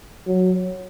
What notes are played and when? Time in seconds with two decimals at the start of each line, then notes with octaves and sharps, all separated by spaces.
0.27 F#3